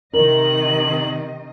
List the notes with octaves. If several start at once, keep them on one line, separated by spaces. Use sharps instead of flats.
C3 D#3 A#4 D#5 F#7